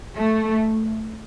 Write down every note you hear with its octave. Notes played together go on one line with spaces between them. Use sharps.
A3